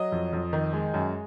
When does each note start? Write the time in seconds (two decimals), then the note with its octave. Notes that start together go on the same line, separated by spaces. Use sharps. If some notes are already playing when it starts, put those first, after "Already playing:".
Already playing: F#3 D#5
0.12 F2
0.33 F2
0.53 D#3
0.73 G#3
0.94 F#2